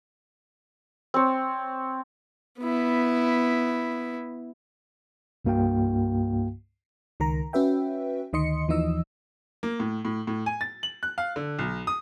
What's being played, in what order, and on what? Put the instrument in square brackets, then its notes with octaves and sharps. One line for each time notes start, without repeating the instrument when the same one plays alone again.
[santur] C4 C#5
[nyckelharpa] B3 E4
[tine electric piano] C2 G2 A#3 F#4 F5 G5
[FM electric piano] C#2 D#3 A#4 A#5
C#4 F#4 B4 E5 G5
D2 D#3 D#5 C6 C#7
D#2 E3 F3 D#4 D#5 E6
[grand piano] A#3
A2
A2
A2
G#5
A6
F#7
F#6
F5
D3
B1
D#6